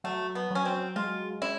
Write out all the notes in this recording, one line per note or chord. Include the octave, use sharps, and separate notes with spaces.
F#3 A3
B3
F#3 C#4
C4
G#3 F4
C#4 E4